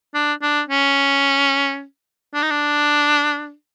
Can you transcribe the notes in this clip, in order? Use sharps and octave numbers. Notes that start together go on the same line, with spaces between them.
D4
D4
C#4
D4
D#4
D4